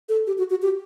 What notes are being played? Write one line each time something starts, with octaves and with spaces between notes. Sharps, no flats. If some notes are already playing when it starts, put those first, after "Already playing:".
A4
G4
F#4
F#4
G4